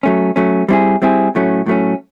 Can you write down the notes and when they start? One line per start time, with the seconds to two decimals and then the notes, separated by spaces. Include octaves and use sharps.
0.03 F#3 A3 C#4
0.36 F#3 A3 C#4
0.68 G3 C4 E4 G#4
1.02 G3 C4 E4 G#4
1.35 A2 F#3 A3 C#4
1.66 A2 F#3 A3 C#4